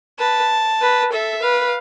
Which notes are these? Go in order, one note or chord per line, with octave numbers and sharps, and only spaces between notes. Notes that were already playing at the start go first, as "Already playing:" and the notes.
B4 A5
B4
A4 E5
B4 F5